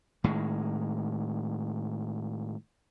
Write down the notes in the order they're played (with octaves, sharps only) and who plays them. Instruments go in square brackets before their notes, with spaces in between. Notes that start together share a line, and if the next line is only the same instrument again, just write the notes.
[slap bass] A2 D#3 G#3